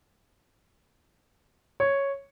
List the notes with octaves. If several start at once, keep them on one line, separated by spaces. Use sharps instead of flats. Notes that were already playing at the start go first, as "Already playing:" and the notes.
C#5